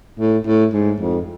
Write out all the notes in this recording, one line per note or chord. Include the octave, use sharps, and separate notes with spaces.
A2
A2
G#2
F2